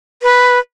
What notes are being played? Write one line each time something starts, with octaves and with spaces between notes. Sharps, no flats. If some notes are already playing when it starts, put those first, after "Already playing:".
B4